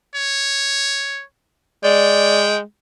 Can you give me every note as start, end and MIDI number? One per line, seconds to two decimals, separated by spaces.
0.15 1.23 73
1.84 2.62 56
1.84 2.42 74
1.84 2.58 79